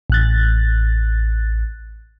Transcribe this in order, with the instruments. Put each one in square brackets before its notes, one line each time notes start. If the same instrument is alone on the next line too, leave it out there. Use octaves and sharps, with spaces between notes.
[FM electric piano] A1 F#6 A6